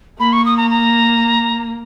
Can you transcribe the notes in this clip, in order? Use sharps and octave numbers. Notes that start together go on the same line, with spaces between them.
A#3 B5
C#6
D#6
A#5
A#5